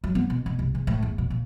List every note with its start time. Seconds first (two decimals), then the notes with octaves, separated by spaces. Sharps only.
0.04 F#3
0.15 B3
0.30 B2
0.46 B2
0.59 C2
0.75 E2
0.87 A2
1.03 E2
1.18 B2
1.30 A#2